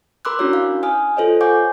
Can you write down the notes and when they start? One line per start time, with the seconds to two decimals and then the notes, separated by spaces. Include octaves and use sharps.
0.25 A#4 B5 C6 D6 E6 F#6
0.39 C#4 D4 E4 F#4 A#4 C#5
0.53 F5
0.83 C#5 G#5 D#6 F6
1.17 F4 A4 C5 C#5 D#5
1.41 F#5 G#5 C#6 D6 G6